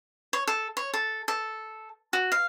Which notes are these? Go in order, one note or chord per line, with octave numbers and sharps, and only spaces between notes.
C#5
A4
C#5
A4
A4
F#4
F5